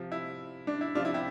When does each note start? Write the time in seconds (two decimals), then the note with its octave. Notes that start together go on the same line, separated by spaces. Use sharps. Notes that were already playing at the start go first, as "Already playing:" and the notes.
Already playing: C3 F3
0.12 E4
0.67 D4
0.81 E4
0.95 C3 D4 F4
1.00 F3 E4
1.14 E4 G4